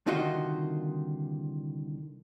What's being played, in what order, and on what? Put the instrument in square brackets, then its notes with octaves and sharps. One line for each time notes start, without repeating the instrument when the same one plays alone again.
[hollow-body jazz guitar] C2 D3 D#3 F4 F#4 D#5